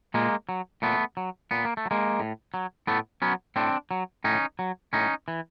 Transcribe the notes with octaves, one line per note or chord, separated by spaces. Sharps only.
A#2 G#3 A#3
F#3
A#2 A3 B3
F#3
A#2 B3
A#3
A3
F#3
G#3 A#3
A2
F#3
A2 A3 B3
F#3 B3 C#4
A2 C4 D4
F#3
A2 C#4 D#4
F#3
A2 C#4 D#4
E3